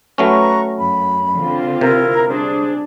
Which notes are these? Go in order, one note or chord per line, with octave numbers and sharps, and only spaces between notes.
F#3 A3 C#4 B4 A#5 C#6
F#2 B5
D3 C4 F4
C3 E4 A#4 F5
G3 D4 G#4 C5